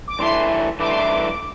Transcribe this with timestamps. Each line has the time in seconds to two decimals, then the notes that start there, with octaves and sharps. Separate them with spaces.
0.08 D6
0.19 G2 E3 A3 E4 C6
0.80 G2 E3 A3 E4 D6
0.88 C6
0.96 D6